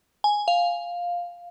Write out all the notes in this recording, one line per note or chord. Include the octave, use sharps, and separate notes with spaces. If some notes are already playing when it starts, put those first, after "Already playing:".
G#5
F5